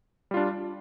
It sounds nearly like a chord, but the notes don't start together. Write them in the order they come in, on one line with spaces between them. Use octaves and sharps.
G3 F4 D4